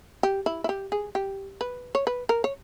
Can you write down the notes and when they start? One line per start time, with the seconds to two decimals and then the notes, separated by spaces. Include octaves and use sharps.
0.23 G4
0.46 E4
0.64 E4
0.69 G4
0.92 G#4
1.15 G4
1.61 B4
1.95 C#5
2.07 B4
2.29 A#4
2.44 C#5